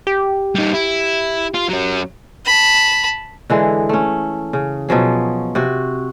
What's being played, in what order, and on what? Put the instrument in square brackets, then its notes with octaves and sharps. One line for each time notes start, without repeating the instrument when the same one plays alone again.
[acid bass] G4
[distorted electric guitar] G3 D#4
E4
F4
F#3 C#4
[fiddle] A5 B5
[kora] D3 E3 G#3
A3 C#4
C#3
B2 F3 F#3 G#4
C3 F#4